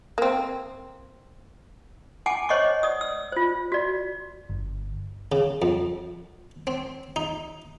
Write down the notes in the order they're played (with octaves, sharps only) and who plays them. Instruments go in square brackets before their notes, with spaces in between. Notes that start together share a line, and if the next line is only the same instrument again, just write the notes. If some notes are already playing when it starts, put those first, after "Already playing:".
[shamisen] A#3 C4
[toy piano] F#5 G#5 A5 D6
C5 C#5 D#5 F#5 C#6 D6
D5 D#6
E6
F4 C5
F#4 D5
[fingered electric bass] G1
[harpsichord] C#3
F2
C4
D#4